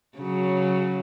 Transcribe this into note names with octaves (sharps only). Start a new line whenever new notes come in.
C#3 F#3